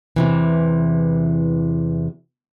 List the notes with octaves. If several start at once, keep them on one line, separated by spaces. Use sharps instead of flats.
E2 C3 E3